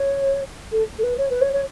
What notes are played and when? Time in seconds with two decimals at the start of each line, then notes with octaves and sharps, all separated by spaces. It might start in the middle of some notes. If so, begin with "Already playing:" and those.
Already playing: C#5
0.72 A4
0.99 A4
1.03 B4
1.18 C#5
1.30 B4
1.41 C#5
1.53 C#5